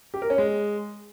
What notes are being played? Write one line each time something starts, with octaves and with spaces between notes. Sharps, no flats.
G4
A#4
C#4
G#3